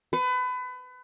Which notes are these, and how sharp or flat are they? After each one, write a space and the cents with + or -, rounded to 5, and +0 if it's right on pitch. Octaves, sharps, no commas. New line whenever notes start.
B4 +30